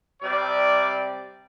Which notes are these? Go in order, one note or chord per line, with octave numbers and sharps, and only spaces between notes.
C3 G3 D5